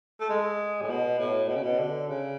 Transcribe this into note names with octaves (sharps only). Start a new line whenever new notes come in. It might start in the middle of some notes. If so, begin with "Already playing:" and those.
A3
G#3
A2
B2
A2
B2
C#3
B2
D3
C#3